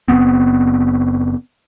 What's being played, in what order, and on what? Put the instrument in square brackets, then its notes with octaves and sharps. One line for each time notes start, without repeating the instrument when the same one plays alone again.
[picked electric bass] F#1 A#2 B3 C4